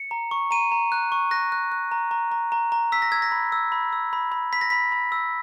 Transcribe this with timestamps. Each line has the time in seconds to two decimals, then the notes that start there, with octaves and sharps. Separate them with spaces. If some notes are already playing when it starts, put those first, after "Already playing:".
Already playing: C#7
0.11 A#5
0.31 C#6
0.51 A#5 D#7
0.72 A#5
0.92 F#6
1.12 C#6
1.31 F#6 A#6
1.52 F#6
1.72 F#6
1.92 A#5
2.11 A#5
2.32 A#5
2.52 A#5
2.72 A#5
2.92 E6 B6
3.02 A#6
3.12 E6 G#6
3.22 A#6
3.32 B5
3.52 E6
3.72 B5
3.93 E6
4.13 B5
4.32 B5
4.53 B5 B6
4.61 A#6
4.70 B5 B6
4.92 B5
5.12 E6